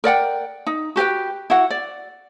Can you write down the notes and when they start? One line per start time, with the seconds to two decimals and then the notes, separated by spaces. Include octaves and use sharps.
0.04 A#4 D5 F#5 G5
0.67 D#4
0.96 F#4 G4 B4 G5
1.50 E4 F#4 F#5
1.70 D5